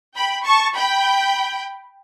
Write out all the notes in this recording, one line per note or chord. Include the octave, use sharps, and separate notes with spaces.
G5 B5
A5 C#6
G5 B5